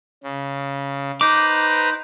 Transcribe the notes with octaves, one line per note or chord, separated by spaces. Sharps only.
C#3
D#4 B4 C5 A#5 D6